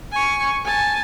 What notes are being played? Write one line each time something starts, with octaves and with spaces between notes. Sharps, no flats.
G#5 C#6
G#5 A5